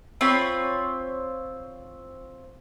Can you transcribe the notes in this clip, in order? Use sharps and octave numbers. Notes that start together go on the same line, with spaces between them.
C4 F4 C#5 B5